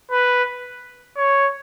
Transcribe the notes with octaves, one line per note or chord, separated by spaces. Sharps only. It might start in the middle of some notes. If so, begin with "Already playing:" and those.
B4
C#5